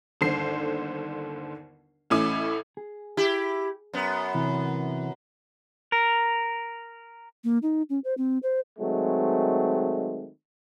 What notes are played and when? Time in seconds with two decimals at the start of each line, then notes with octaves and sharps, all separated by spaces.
0.21 G1 D#2 D3 C5 C7
2.10 A1 A2 C#4 E4 D6
2.77 G#4
3.17 E4 G4
3.93 F#2 B3
4.34 C3 E3
5.92 A#4
7.44 A#3
7.62 D#4
7.90 C#4
8.04 C5
8.17 C4
8.43 C5
8.79 D#3 F#3 G#3 A3 C4